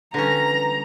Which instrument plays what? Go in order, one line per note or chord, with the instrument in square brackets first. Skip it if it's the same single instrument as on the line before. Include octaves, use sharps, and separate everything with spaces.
[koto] D3 C#4 [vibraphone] G3 B4 [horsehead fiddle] A#5 [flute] A#6